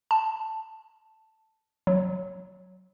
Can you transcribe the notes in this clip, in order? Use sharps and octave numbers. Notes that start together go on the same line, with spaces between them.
A5
F#3